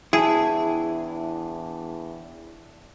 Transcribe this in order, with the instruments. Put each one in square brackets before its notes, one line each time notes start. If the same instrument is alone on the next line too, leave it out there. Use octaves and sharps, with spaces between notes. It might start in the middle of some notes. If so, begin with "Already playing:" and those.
[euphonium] E2 [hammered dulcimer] D4 C#5 G5 [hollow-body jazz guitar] E4 [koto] G#4